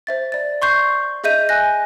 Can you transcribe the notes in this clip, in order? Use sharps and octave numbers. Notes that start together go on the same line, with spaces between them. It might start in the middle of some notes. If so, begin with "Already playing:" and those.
C5 E5 A6
D5 A6
C6 C#6 G6 C7
G#4 D#5 E5 G6 D#7
G#5 F#6 A#6